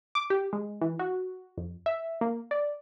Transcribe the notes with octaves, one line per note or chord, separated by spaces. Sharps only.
D6
G4
G#3
E3
F#4
F2
E5
A#3
D5